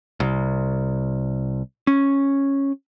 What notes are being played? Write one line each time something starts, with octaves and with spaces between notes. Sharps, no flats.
C2
C#4